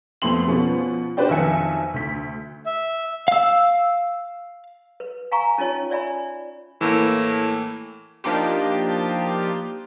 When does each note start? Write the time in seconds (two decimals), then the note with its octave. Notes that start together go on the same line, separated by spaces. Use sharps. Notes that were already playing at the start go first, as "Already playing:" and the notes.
0.22 F2 A3 B3 C6 F#7
0.48 B2 F3 B3 C#4
1.17 D4 F#4 B4 C5 D5 G5
1.29 B1 F2 D#3 E5 G#5 C#7
1.94 D2 B6
2.66 E5
3.28 F5 E6
5.00 B4
5.32 F5 G#5 A#5 C#6
5.58 C#4 D#4 F4 C#5 A5
5.90 C#5 D5 E5 G#5 B5
6.81 A2 E3 A#3
8.24 F3 A#3 D4 D#4 F4 G4